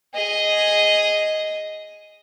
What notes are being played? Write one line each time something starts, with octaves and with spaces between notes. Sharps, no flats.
G#4 D#5